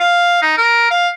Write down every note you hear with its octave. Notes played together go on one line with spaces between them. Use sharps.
F5
D#4
A#4
F5